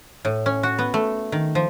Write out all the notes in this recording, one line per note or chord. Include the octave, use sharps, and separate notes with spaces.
A2
C#4
F#4
B3
A3
D#3
F3